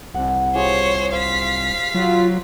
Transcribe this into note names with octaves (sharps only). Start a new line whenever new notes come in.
C2 F#5
F4 G4 G#4 C5 C#5
C5 F5 B6
F#3 F4